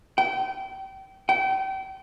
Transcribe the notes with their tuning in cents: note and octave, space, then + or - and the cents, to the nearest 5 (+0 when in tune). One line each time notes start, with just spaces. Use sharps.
G5 -30
G5 -35